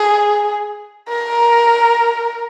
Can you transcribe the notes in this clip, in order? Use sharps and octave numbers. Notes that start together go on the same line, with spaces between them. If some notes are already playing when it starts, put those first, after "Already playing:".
Already playing: G#4
A#4